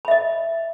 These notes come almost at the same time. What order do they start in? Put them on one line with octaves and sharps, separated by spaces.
B5 E5 D#5